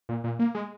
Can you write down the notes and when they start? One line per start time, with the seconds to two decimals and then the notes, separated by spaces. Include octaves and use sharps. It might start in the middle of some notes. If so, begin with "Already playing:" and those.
0.09 A#2
0.24 A#2
0.39 A#3
0.55 G#3